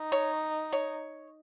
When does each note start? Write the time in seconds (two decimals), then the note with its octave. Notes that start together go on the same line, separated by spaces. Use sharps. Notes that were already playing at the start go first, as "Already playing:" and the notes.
Already playing: D#4
0.12 C#5
0.73 C#5